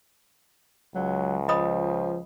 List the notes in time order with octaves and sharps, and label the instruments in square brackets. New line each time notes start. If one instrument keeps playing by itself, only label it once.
[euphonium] C#2 [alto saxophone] F#3
[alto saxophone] F3 [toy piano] D#5 B5 D#6